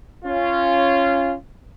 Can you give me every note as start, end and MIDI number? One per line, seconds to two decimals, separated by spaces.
0.25 1.34 61
0.25 1.34 65